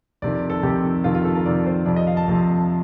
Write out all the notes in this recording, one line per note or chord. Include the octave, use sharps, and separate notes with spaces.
F2 C3 D#3 D5
A4
F2 C3 D#3 G4
F2 C3 D#3 F4
F4
A4
A#4
F2 C3 D#3 D5
C5
F2 C3 F3 D5
D#5
F5
A5
F2 C3 F3